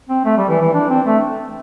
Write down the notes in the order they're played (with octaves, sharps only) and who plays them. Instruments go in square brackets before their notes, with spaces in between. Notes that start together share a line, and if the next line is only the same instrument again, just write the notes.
[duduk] C4
A3
G3
E3
E3
D4
C4
A3